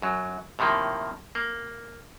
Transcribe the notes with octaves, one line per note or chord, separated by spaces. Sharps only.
F#2 F#3
A2 C3 D#3 F3 A#3
A#3